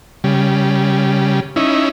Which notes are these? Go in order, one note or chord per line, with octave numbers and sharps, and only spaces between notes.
C#3 G3
C#4 D#4 E4